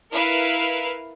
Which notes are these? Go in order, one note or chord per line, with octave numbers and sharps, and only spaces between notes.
E4 A#4 B4 F5